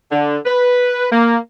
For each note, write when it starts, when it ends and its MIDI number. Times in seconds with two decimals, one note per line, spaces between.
0.11 0.37 50
0.46 1.07 71
1.12 1.37 58